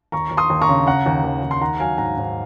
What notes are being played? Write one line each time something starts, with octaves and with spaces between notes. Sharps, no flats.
D#2 A#5 C#6
D#2
C6 D#6
D#2
A#5 C#6
C#3
C#3 F#5 A#5
D#2
D#2
D#2
C6
D#3 F#5 A#5
F#3 F5 G#5
G#2 F#5 A#5
G#2